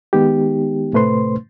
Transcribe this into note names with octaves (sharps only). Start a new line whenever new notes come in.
D#3 G#3 B3 D#4 G4
A2 C3 A3 B4 C5 C6